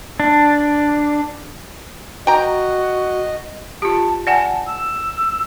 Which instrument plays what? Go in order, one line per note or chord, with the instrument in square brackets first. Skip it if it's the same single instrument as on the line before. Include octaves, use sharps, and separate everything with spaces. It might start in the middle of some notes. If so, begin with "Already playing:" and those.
[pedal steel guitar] D4
[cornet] F#4 [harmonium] D#5 [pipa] G5 A#5
[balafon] F4 G4 [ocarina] A5
[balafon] D5 F#5 G#5 [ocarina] A5
[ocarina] E6